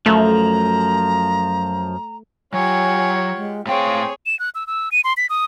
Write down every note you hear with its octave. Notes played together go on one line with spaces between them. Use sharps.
F#2 F3 A3 A#5
F#3 F4 G4 C#5 F#5 G#5
G#3
A2 C4 G#4 C#5 F5 G5
E7
F#6
E6
E6
D#7
C6
B6
D#6